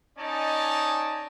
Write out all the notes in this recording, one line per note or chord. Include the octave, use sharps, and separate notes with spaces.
C#4 D#4 D5 D#5 G#5 A5